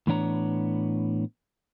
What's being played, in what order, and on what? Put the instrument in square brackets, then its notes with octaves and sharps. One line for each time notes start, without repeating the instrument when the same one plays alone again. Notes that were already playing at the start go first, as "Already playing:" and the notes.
[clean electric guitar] A2 E3 B3 D4 C#5 A#5